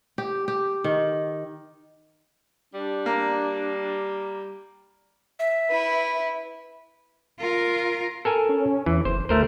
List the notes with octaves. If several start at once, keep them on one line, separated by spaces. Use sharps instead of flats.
G4
G4
D#3
G3 D4
A#3
E5
E4 B4
F4 A#4
A4 A#4 G#5
C#4
E2 E3
F#1 C5
D2 A3 A#4 C5